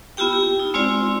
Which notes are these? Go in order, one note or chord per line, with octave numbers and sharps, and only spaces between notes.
B3 E4 F4 G4 G5
G4
D#4
G#3 C4 E4 F4 C5 D5